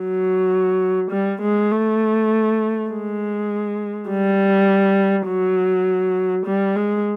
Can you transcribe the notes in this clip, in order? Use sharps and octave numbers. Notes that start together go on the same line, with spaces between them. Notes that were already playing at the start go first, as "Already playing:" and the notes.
Already playing: F#3
G3
G#3
A3
G#3
G3
F#3
G3
G#3